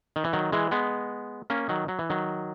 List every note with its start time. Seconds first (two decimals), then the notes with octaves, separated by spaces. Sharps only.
0.16 D#3
0.24 E3
0.33 D#3 F#3
0.52 E3 G#3
0.71 G#3 B3
1.50 A#3 C#4
1.69 D#3 F#3
1.88 F#3
1.99 E3
2.10 D#3 F#3